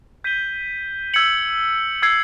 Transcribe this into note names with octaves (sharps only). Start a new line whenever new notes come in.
G6 B6 D#7 G7
E6 G#6 C#7 F#7
E6 G#6 C7